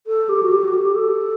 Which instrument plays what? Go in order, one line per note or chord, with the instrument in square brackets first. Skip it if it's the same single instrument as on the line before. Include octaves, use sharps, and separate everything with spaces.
[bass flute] A4
G4
F#4
G4
F#4
G4
A4